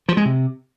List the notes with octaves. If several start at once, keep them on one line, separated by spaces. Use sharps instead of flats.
F3
G#3
C3